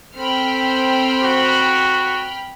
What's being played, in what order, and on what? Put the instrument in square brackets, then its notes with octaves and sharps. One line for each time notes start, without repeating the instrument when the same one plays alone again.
[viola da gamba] C4 A4 C5 [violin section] G5 B5 F6
[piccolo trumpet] F#4